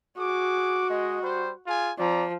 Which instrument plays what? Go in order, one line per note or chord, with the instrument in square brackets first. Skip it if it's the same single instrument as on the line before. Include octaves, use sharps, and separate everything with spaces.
[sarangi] F#4 [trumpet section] G#4 D6
[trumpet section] G#3 D#5
G3 C5
F4 G#4 G#5
[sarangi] F3 [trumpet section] C4 D5 A#5